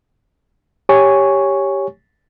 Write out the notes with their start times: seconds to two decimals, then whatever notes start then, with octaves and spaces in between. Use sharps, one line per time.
0.89 G4 C#5 G#5 C#6